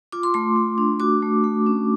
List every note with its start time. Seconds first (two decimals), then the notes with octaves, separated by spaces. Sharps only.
0.12 F4 D6
0.23 C6
0.34 A3 C6
0.56 A3
0.78 D4
1.00 F#4 D6
1.22 A3
1.44 A3
1.66 C#4